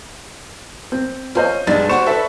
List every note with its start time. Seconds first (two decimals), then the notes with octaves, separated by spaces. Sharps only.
0.92 C4
1.35 C#4 F4 C5 D#5
1.67 B1 G2 G#3 A6
1.89 G3 F#4 C5 C#6 E7
2.07 A4 B4 E5